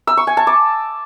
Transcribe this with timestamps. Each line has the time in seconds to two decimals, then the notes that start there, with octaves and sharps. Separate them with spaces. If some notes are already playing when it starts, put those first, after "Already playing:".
0.07 E6
0.17 C#6
0.27 G#5
0.37 A5
0.47 D6